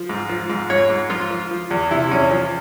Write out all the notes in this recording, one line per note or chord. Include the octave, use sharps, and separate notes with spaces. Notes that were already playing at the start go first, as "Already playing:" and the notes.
Already playing: F3
G#2
F3
G#2
G#2 C#5
G#2
F3 F4
F3
F3
E2
C3 E4
E2 C#4
F3